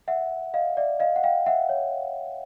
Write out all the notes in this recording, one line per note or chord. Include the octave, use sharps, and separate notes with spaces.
E5 F#5
D#5 F5
D5 E5
D#5 F5
F#5
F5 G5
E5 F#5
C#5